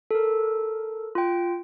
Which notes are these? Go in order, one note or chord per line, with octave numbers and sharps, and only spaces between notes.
A4 A#4
F4 G5